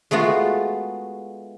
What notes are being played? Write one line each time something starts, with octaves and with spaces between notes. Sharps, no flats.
G#3 A3 B3 F4 F#4